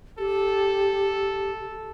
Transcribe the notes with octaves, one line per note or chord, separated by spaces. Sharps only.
G4 A4